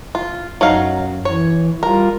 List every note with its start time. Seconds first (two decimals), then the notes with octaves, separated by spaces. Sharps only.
0.15 F4
0.61 F#2 F#3 D#4 F5
1.25 E3 C#5
1.83 G3 F4 A#4